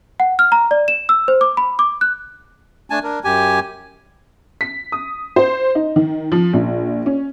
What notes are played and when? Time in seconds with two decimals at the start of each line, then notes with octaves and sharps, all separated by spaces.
0.20 F#5
0.39 F6
0.52 A#5
0.71 D5
0.88 E7
1.09 E6
1.28 C5
1.41 D6
1.57 B5
1.79 D6
2.01 F#6
2.90 A3 D4 G#5 A5
3.03 D4 A#4
3.24 F#2 G4 G#5
4.61 B6
4.92 D#6
5.36 C5
5.75 D#4
5.96 D#3
6.32 F3
6.53 A#1
7.06 C#4